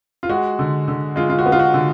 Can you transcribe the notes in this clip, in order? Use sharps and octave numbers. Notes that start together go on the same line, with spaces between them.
F4
G#3 F#4
D3
D3
G#3 F4
F4
F#4
B3
F4
F#4
D3